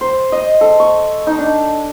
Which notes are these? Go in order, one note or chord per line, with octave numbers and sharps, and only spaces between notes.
C5
D#5
A4
C#6
D#4
D4